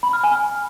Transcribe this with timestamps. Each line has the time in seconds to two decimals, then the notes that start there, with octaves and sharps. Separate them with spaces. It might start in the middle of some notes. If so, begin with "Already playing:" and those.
0.03 B5
0.13 F6
0.24 G#5